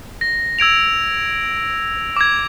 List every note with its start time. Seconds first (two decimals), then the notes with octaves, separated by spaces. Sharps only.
0.21 A#6
0.59 E6 G#6 D7 F7
2.17 D6 G#6